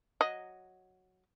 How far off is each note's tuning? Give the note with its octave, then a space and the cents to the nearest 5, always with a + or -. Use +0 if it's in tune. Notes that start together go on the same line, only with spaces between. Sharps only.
F#3 +0 D#5 +0